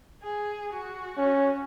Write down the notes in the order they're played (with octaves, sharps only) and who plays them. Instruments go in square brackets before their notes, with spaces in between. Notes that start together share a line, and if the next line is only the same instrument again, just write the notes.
[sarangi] G#4
F#4
[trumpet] C#4